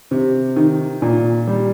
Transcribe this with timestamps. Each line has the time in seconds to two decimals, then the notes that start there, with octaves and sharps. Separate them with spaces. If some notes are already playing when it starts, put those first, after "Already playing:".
0.11 C3
0.56 D#3
1.02 A#2
1.47 G3